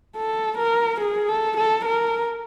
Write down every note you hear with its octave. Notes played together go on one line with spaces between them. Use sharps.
A4
A#4
G#4
A4
A4
A#4